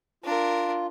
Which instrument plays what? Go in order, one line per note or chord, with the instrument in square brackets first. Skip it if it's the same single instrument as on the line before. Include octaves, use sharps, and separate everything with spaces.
[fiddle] D4 A#4 [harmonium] F4